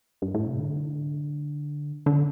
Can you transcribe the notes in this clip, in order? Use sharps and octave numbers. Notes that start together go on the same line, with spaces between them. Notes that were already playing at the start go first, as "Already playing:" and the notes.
G2
A2
C3
D3
D3